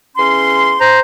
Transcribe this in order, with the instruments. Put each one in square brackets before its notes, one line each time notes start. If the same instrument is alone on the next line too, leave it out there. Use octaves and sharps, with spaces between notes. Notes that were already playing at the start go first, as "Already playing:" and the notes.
[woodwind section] E2 C#4 C6
[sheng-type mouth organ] C5 A#5